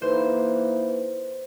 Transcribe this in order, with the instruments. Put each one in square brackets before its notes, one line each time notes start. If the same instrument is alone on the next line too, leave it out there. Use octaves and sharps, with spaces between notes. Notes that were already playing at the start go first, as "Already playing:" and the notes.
[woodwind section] E3 A#3 D#4 [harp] C5